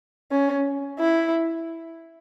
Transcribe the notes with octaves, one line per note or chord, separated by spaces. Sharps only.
C#4
E4